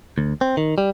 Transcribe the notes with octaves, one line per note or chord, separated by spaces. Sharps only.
D2
C4
D#3
G3